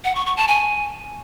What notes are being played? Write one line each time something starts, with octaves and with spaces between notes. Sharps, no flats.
F#5
C#6
C#6
A5
G#5